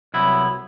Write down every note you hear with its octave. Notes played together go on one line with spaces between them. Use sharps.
C2 C3 F#3 B3 E4